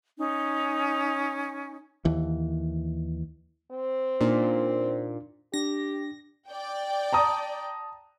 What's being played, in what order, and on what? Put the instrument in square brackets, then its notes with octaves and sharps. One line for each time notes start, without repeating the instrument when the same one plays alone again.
[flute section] C#4 D#4
[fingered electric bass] D#2 E3
[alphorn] C4
[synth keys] A#2 [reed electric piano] D4 D#4
[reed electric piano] D4 [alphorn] G4 [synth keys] A#6
[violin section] D5 G5
[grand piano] A5 A#5 D#6